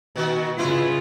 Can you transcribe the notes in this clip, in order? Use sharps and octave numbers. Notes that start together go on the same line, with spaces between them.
A#2 D#3 F#4
C#3 B3 E4 F4 B4